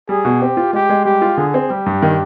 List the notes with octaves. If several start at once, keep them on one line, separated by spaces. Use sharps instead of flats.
G3 G#4
B2
C4 G4
F4
G#3 G4
G#3
G3 G4
F4
D3 G#4
C4
G3 G4
G2
D#3